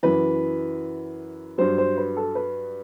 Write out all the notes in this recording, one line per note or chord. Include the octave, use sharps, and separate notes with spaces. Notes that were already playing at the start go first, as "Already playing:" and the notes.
F#2 E3 B4
G2 F#3 C5
C5
B4
A4
B4